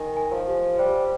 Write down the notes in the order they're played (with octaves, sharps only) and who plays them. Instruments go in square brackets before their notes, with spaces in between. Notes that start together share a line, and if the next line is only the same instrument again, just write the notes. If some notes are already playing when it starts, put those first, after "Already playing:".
Already playing: [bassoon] D#3 [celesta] G#5
[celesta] G#5
[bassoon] F3
[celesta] G4
[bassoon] G3 [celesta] C5